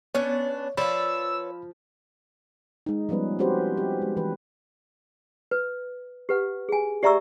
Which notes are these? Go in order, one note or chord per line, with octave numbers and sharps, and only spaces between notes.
B3 C#4 D4 C#5
F3 B4 C#5 D5 F5 B5 E6
G#3 D#4
F3 G3 B3 C#4 B4
C4 C#4 F#4 G4 B4 C5
G4
G#3
E3 B4
B4
G4 B4 F#5
G#4 G#5
G4 D5 E5 A#5 C#6 E6